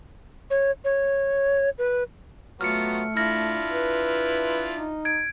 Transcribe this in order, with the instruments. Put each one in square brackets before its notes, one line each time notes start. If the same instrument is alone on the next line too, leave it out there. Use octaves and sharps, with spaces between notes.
[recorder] C#5
C#5
B4
[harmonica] F#3 B3 F4 [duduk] A3 [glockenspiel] F6 C#7
[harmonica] D4 E4 F4 [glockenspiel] F6 A#6
[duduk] B4
D#4
[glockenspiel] G#6 D7